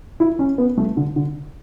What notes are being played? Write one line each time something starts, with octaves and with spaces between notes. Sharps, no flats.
E4
C#4
B3
A3
D3
D3